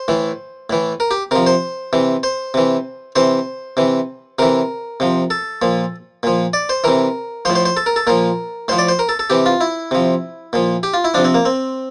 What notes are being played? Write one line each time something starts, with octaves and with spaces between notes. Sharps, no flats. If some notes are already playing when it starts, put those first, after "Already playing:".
Already playing: C5
A2 E3
A2 E3
A#4
G4
C3 F3 A#4
C5
C3 E3
C5
C3 E3
C3 E3 C5
C3 E3
C3 E3 A#4
C3 F3
A4
A#2 F3
A#2 F3
D5
C5
C3 E3 A#4
A2 F3 C5
C5
C5
A4
A#4
A4
A#2 F3 A#4
A2 F3 C5
D5
C5
A#4
A4
A4
C3 E3 G4
F4
E4
C3 F3
A#2 F3
G4
F4
E4
C3 F3 D4
C4
A#3
C4